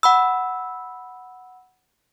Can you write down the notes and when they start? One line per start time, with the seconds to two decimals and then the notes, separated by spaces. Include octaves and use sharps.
0.03 F#5 B5 E6